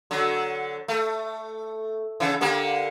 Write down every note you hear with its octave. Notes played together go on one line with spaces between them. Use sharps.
D3 F#3
A3
C#3 E3
D3 A#3 G4